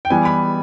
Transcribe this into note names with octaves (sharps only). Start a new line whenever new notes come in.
G5
E3 G3 B3 G#5
B5